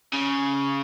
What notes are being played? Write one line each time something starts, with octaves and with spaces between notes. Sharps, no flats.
C#3